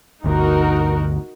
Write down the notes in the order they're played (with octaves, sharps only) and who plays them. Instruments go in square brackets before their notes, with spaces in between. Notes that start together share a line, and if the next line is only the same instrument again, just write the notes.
[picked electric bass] G1 D2 [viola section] D#4 F#4 A#4